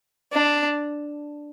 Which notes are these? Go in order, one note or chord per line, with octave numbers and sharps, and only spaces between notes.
D4